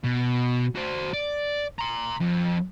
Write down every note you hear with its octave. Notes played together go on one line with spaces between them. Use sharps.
B2
F#4 C5
D5
A#5 C6
F2